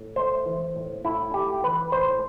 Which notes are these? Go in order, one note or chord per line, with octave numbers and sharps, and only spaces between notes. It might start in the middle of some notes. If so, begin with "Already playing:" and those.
Already playing: A2
A3 C5
E3
A2
A2 E4
A3 G4
E3 B4
A2 C5